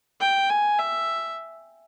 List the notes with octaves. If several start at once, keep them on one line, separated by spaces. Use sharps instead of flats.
G5
G#5
E5